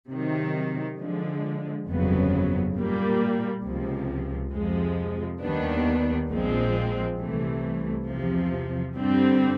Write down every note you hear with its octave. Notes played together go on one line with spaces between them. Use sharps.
C3 D#3 F#3
D3 F3 G#3
G1 F2 C#3 F#3 B3
A#2 G3 A#3
C#2 C3 F3
F2 C3 F3 G#3
D#2 D#3 G3 B3 D4
A#1 A#2 F3 G#3 C4
C2 C3 E3 A3
E2 C3 F3
G2 D3 G3 C4